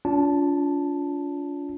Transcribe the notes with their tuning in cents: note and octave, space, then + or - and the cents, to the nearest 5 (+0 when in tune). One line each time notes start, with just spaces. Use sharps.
D4 -45 F4 +0 A5 +0